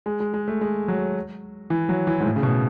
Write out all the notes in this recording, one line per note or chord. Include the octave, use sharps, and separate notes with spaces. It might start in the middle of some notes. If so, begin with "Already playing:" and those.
G#3
G#3
G#3
A3
G#3
F#3
E3
F#3
E3
G#2
A2
C#3
B2